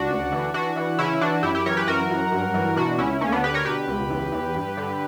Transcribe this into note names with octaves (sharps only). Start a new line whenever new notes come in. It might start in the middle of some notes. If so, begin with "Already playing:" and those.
Already playing: C#2 D4 F#4
D2
E3
E3 D4 F#4
E3
C#3 C#4 E4
E3 D4 F#4
F#2 E4 G4
E4 G4
E3 A#4 C#5
G4 B4
F#2 F#4 A#4
F#2
G2
E3
B2 D4 F#4
C#2 C#4 E4
D2 A#3 C#4
B3 D4
D3 G4 B4
A#4 C#5
B2 G4 B4
C#2
E2
E2
G2
D3